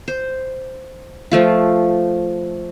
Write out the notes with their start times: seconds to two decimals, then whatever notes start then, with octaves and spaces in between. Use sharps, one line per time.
0.08 C5
1.31 F3 A3 F4